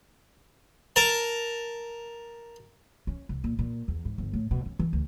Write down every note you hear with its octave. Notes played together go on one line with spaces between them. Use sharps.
A#4 A5
C#4
C2
A#2
A#2
E2
G#2
G1
A2
B2
C#4
E3
D2